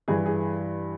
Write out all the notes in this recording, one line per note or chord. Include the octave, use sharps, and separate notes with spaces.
G2 E3 G#4
G#4